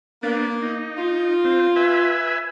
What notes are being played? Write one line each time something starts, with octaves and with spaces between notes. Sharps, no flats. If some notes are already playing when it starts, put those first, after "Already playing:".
A#3 B3 D4
D#4
F4
C4
B4 E5 G#5